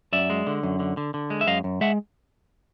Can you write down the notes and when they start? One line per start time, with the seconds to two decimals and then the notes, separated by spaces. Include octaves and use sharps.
0.13 F#2 D5 E5
0.30 G#3
0.47 D3
0.63 F#2
0.80 D3
0.97 D3
1.14 D3
1.30 G#3
1.41 E5
1.47 F#2 D#5 F5
1.64 F#2
1.81 G#3 E5 F#5